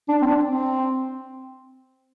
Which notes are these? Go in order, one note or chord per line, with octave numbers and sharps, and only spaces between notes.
D4
C4
D4
C4